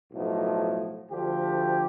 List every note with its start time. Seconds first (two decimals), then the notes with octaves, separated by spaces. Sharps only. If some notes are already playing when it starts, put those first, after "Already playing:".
0.12 B1 A2 F3
1.11 D2 D3 F3 G4